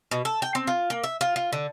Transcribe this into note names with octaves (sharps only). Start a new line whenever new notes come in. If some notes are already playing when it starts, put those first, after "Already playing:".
B2
A4
G5
C4
F4
A#3
E5
F4
F4
D3